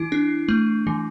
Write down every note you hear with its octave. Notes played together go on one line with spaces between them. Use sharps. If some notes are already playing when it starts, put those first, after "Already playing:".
Already playing: E3 E4
D4
A3
E3